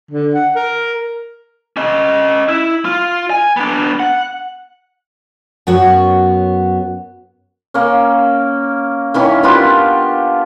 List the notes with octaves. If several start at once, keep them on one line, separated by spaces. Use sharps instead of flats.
D3
F#5
A#4
C#4 D#5
E4
F4
G#5
B3 D4
F#5
F#2 B3 F#4 C#5
A#3 C#4
D#3 E3 C#4
B3 D4 F4 G4